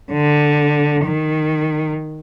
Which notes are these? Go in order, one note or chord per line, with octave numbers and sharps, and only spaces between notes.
D3
D#3